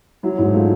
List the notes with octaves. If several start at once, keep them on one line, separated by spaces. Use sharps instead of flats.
F#3 E4
G#2 E4
A3 F4